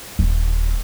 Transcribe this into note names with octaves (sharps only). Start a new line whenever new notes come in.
D#1